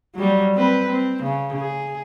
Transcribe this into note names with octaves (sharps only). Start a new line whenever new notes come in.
F#3 G3
C4 B4
C4
C#3
G#4